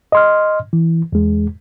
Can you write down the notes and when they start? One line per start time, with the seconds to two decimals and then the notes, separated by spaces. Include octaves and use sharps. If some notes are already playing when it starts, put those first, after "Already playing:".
0.12 D#5 C6 F6
0.73 E3
1.12 E2 G#3